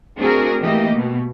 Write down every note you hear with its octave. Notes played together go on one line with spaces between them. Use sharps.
A3 C4 D4 F#4 G#4 A#4
E3 A3 A#3 G4 D#5
B2